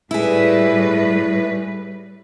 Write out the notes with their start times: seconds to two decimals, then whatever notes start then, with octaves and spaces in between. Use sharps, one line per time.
0.11 A2 G3 E4 G#4 B4